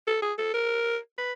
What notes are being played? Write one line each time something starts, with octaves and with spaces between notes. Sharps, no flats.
A4
G#4
A4
A#4
B4